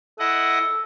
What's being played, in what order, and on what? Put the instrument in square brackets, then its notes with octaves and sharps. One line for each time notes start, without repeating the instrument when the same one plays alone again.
[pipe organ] E4 D#5 F#5 [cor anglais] A4